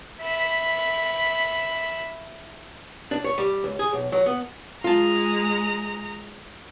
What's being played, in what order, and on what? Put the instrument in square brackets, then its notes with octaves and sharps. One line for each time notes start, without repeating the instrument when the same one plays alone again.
[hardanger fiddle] E5 B5
[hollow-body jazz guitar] D4
C#5
G3
C#2
G#4
B1
F#3
B3
[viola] G#3 A#5 [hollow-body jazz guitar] F4 A5